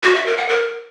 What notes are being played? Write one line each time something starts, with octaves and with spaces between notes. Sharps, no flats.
F#4
E5
A#4
F#5
A#4